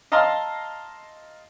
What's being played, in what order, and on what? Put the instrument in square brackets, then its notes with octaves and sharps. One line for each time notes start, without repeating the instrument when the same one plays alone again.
[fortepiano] D#5 F5 A5 A#5 C6 E6